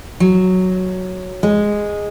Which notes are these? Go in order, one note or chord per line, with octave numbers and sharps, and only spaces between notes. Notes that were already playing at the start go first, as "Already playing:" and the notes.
F#3
G#3